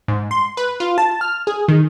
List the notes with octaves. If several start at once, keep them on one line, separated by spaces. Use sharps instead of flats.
G#2
C6
B4
F4
A5
F6
G#4
D#3